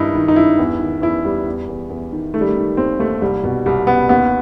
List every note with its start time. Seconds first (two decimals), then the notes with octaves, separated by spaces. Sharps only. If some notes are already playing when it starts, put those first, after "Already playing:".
Already playing: G2 D#3 D#4 E4
0.15 D#3
0.28 D#4
0.36 G2 E4
0.59 E2
0.80 D#3
1.02 E2 E4
1.25 E2 G3
1.46 E2
1.69 E2
1.90 E2
2.13 D#3
2.34 D#3 A3
2.41 G3
2.48 A3
2.57 D#3
2.77 D#2 C4
2.99 D#2 A3
3.21 C2 G3
3.44 B2
3.66 C2 G3
3.87 C2 B3
4.09 D#2 B3